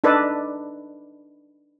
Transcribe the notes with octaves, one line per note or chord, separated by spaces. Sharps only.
D4 D#4 A4 B4 D5